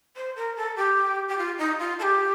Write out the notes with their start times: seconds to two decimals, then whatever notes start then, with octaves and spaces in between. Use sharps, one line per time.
0.16 C5
0.36 A#4
0.57 A4
0.76 G4
1.28 G4
1.38 F4
1.58 D#4
1.79 F4
1.99 A4
2.03 G4